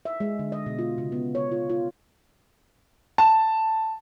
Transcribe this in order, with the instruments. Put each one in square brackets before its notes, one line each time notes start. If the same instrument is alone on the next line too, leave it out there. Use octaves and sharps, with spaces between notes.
[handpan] E5
G#3
D3
D#5
B2
F4
C#3
B3
C#5
F4
F4
[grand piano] A5